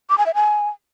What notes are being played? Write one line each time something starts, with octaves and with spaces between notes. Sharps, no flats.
D6
G#5
E5
G#5